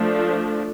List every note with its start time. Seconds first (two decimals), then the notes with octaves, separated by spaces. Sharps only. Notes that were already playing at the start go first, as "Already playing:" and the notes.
Already playing: F3 A3 D4